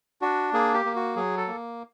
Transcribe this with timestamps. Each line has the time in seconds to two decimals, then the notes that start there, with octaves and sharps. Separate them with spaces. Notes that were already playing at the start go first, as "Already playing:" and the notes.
0.22 D4 F#4
0.53 A#3 G#4
0.74 G4
0.85 A#3
0.96 F#4
1.16 F#3 G#4
1.37 A4
1.48 A#3